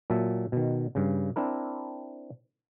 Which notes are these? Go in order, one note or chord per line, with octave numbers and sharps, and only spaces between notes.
A#2 F#3 E5 A5
B2 D#3
G2 C#3
C4 D4 E4 A#4